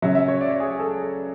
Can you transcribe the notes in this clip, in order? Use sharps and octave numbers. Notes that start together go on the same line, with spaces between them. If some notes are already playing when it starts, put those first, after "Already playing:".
C#3 F#3 E5
E5
C#5
D5
C#5
G#4
G#4
A4